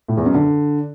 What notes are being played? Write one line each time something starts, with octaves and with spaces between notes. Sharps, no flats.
A2
E2
F#2
D3